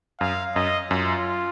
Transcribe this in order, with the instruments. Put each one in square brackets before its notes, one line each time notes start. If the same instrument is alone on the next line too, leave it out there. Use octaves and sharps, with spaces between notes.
[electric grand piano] F#2 [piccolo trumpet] F5
[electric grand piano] F#2 [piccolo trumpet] D#5
[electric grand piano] F#2 [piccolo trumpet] F4